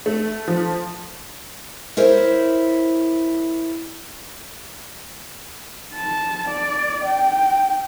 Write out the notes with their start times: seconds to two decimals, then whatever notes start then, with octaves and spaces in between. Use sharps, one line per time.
0.06 A3
0.48 F3
1.97 E4 A#4 C5 C#5
5.95 A5
6.49 D5
7.04 G5